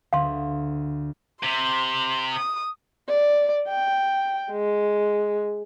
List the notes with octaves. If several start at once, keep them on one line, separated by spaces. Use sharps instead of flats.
D2 F5 C6
C3 C6
D#6
D5
G5
G#3